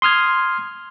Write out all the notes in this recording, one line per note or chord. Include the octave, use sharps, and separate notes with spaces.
C6 D#6 F6 G#6